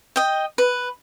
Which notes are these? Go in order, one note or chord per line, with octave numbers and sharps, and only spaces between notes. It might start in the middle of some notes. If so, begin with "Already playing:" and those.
D#5 G5
B4